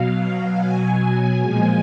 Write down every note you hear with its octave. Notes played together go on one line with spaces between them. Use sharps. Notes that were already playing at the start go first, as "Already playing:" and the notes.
Already playing: B2 F#3 F5
G#5
A#2 F3 G#3 G#5